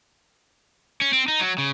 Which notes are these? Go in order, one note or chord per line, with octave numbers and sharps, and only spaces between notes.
C#4
C4
D#4
F#3
C#3